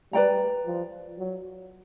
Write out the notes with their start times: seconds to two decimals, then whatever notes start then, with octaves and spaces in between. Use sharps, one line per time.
0.13 G3 B4 D5 G5 A#5
0.66 F3
1.19 F#3